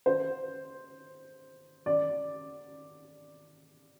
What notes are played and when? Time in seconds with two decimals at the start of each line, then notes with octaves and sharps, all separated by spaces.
0.06 C5
1.86 D5